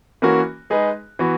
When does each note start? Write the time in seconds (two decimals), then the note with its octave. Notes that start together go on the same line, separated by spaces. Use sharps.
0.22 E3 A#3 C#4 F#4 A#4
0.70 G#3 D#4 G#4 B4
1.19 E3 B3 F#4